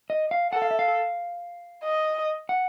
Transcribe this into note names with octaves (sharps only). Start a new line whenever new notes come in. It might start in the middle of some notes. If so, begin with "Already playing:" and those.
D#5
F5
A4 F#5
F5
E5
F5
D#5
F#5